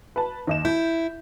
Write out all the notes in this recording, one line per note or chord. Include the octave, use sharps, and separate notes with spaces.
B4 A5
D#2 D#5 E7
E4 G6